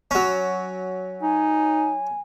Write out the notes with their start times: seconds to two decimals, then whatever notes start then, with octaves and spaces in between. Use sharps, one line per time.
0.11 F#3 C#4
1.22 D#4 G#5